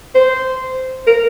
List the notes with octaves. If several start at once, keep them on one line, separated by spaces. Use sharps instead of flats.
C5
A#4